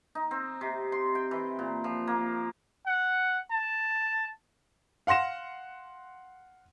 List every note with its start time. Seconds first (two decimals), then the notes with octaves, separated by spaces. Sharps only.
0.15 D#4
0.31 C4
0.61 C3
0.92 C6
1.15 G5
1.31 E3
1.59 A#2
1.84 F3
2.07 A#3
2.87 F#5
3.51 A5
5.07 F5 F#5 C6 A#6 E7